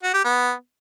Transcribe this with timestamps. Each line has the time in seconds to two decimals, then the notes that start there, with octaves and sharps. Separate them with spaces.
0.03 F#4
0.14 G4
0.24 B3